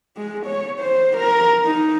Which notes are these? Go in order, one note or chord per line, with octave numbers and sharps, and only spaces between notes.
G#3
C#5
C5
A#4
D#4